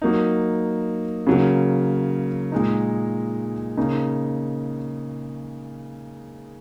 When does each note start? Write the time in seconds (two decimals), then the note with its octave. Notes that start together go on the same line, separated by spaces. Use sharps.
0.02 F#3 A#3 D#4
1.27 C#3 F#3 A#3
2.52 A#2 G#3 D#4
3.77 C#3 A#3 D#4